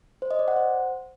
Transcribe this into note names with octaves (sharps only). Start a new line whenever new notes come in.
C5
D#5
D5
F#5
C5